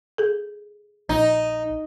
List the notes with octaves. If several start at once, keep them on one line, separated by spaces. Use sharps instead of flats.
G#4 A4
A#1 D#4